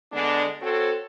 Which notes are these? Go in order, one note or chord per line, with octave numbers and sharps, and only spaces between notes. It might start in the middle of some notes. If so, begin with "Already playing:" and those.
D3 G#3 B3 D4
C4 F#4 A4 C5 C#5